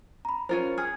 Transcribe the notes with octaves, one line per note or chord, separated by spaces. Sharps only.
A#5 B5
C#4 F4 A#4 C5
G#4 F6